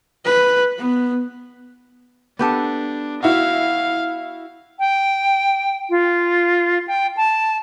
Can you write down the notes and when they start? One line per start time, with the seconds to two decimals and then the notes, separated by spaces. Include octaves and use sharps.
0.25 B4
0.78 B3
2.39 B3 D4 G4 A4
3.23 E4 F#4 F5
4.79 G5
5.90 F4
6.88 G5
7.17 A5